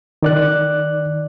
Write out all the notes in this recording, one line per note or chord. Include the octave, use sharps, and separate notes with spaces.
D#3 D5 F#6